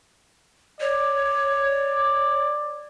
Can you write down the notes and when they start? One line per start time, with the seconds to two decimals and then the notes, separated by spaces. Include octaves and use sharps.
0.81 C#5 D5